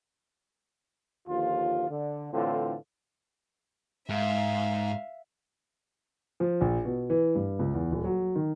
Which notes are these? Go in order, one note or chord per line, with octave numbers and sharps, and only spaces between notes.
D#2 D3 F3 F4
D3
A2 D3 E3 C4 F4
G#2 E5 F5
F3
A#1
B2
E3
G2
C#2
E2
D#1
F#3
D#3